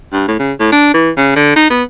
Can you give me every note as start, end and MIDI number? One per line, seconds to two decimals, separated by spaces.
0.13 0.23 43
0.28 0.39 45
0.39 0.52 49
0.60 0.72 45
0.72 0.91 62
0.94 1.10 52
1.17 1.32 49
1.36 1.53 50
1.56 1.70 63
1.70 1.83 59